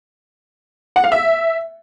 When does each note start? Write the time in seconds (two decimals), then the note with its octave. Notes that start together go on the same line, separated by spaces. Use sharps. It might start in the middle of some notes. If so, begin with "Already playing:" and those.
0.96 F#5
1.04 F5
1.12 E5